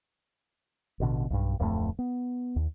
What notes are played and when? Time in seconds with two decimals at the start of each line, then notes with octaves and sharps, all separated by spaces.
1.00 A1 B2 D3
1.30 B1 G2
1.59 D1 F2 E3 A3
1.99 B3
2.56 D#2